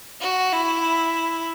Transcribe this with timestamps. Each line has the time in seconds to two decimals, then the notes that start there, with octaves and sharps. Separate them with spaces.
0.21 F#4
0.52 E4